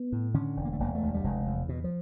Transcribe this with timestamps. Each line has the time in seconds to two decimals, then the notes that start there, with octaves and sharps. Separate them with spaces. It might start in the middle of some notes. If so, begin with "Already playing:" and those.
Already playing: B3
0.12 A2
0.34 D3 C#4
0.56 E1
0.65 A#3
0.73 A3
0.79 E1 A#3
0.95 A3
1.02 D2
1.14 G3
1.24 F1 G#3
1.47 E2
1.69 B2
1.84 F3